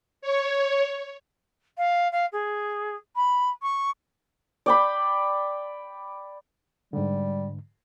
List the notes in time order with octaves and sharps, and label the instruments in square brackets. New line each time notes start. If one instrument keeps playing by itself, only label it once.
[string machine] C#5
[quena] F5
F5
G#4
B5
C#6
[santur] D5 G5 B5
[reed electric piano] G#2 D3 [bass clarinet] G3